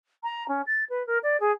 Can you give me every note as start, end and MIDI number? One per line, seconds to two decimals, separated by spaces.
0.23 0.46 82
0.48 0.61 61
0.66 0.83 93
0.89 1.05 71
1.06 1.18 70
1.23 1.39 74
1.40 1.51 68